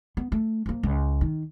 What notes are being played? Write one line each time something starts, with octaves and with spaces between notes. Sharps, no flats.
B3
A3
F3 A#3
C#2
D#3